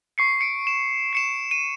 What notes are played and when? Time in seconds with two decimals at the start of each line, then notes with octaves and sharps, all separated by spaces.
0.18 C#6 C7 C#7
0.41 C#7 D7
0.67 E7
1.13 C7 C#7 E7
1.51 D#7